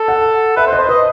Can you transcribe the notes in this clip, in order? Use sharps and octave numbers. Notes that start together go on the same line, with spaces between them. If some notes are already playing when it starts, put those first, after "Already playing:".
Already playing: A4
F#5
B4 E5
C5
D#5
C5
B4 D#5